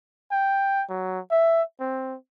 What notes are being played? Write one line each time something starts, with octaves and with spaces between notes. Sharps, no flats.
G5
F#3
E5
C4